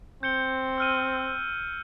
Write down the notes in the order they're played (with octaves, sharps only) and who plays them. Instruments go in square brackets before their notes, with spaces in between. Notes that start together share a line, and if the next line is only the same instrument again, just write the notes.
[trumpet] C4 [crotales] G6 C#7 G7
[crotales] E6 F6 D#7